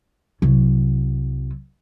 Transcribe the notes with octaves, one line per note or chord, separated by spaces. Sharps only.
C2 F#3